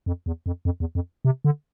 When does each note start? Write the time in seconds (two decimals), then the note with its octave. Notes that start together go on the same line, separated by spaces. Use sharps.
0.06 F2
0.26 E2
0.46 F2
0.65 F2
0.80 E2
0.95 F2
1.25 C3
1.44 D3